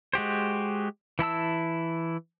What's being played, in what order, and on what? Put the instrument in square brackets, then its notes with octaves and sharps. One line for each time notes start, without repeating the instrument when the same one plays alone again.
[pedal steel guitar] G#3 F#4 G4 C5
E3 E4 A5 E6